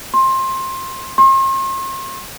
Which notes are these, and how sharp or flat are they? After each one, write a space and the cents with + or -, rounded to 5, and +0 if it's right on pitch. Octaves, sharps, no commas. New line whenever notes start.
C6 +20
C6 +45